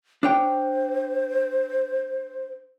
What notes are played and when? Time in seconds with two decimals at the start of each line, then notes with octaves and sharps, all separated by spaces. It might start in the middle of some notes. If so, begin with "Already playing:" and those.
0.23 D4 C5 C#5 G5